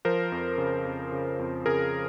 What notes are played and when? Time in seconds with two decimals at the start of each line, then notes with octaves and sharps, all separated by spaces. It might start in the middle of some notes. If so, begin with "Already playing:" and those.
0.05 F3 A#4 C5
0.32 F2
0.58 C#3
0.85 F2
1.12 C#3
1.39 F2
1.66 C#3 G#4 A#4